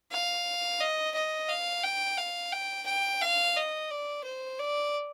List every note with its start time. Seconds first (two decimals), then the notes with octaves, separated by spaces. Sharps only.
0.11 F5
0.81 D#5
1.14 D#5
1.49 F5
1.83 G5
2.18 F5
2.52 G5
2.86 G5
3.22 F5
3.56 D#5
3.90 D5
4.24 C5
4.59 D5